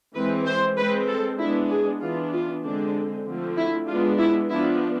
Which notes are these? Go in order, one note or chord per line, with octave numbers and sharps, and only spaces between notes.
E3 G#3 C4 B4
C5
G#3 C4 B4
A4
G#3 B3 D4 E4
G#4
E3 B3 D4 F4
F4
D3 G#3 C4 D4
D3 F3 A3 C4
E4
G#3 B3 D4 F4
E4
F3 B3 D4 E4